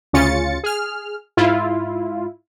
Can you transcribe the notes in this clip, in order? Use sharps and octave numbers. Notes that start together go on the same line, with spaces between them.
D2 C#3 C#4 F4 A6 C#7
G#4 F6
G#2 E4 F4